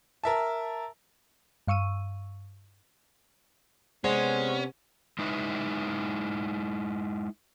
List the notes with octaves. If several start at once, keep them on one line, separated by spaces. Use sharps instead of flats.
A#4 E5 A5
G2 F5 C#6 E6 D#7
C3 G#3 B3 C#4 C5 D5 F#5
G#3 D#4 E4 B4